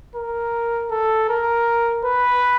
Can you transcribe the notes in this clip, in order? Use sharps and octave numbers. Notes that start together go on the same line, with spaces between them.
A#4
A4
A#4
B4